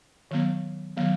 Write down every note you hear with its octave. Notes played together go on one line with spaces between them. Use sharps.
D#3 F#3 B3
D#3 F#3 B3